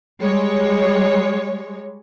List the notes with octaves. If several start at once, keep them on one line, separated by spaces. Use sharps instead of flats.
G3 G#3 C#5